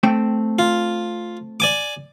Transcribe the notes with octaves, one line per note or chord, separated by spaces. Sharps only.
A3 C4 G5
F4
D5 G#5 D6